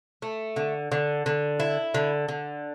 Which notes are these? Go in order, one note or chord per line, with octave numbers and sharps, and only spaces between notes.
A3
D3
D3
D3
E4
D3
D3